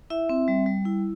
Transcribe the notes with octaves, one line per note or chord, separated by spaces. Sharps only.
E4 E5
C4
G3
G3
E4